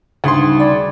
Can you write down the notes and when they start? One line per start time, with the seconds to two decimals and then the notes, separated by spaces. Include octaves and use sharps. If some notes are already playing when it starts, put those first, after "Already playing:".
0.24 D2 C#3 G3 D#4 G#4 C6
0.60 D5 B5